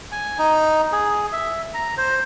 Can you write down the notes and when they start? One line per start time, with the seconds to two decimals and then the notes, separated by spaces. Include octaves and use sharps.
0.12 G#5
0.38 D#4
0.92 G#4
1.33 E5
1.74 A#5
1.98 C5